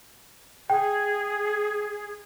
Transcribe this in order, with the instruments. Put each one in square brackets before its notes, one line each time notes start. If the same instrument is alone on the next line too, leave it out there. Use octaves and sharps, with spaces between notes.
[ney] G#4 [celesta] G5